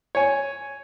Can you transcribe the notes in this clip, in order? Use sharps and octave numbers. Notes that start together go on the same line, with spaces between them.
C#5 G#5